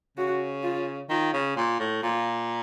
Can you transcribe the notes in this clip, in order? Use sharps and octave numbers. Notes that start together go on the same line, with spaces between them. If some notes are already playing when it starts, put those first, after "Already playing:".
C#3 F#4
F4
D#3 F4
C#3
A#2 F4
A2
A#2 F4